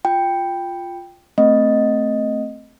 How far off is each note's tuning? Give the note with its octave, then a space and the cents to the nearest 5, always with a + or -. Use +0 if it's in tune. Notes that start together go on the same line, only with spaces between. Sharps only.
F4 +0 G5 +5
A3 +5 C4 +0 D#5 +0